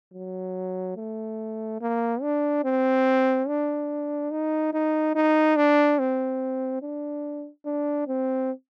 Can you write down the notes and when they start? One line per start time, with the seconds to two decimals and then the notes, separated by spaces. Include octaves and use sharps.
0.14 F#3
0.96 A3
1.81 A#3
2.22 D4
2.64 C4
3.48 D4
4.31 D#4
4.73 D#4
5.15 D#4
5.56 D4
5.99 C4
6.82 D4
7.66 D4
8.07 C4